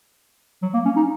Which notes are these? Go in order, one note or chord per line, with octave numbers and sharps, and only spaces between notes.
F#3
A#3
C#4
D#4